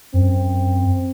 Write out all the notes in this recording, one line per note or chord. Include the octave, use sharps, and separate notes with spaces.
F#2 C4